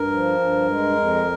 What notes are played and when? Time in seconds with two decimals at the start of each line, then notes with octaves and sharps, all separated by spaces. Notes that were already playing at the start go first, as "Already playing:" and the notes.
Already playing: G2 A#4
0.12 F3
0.39 G2
0.68 G#3
0.96 F2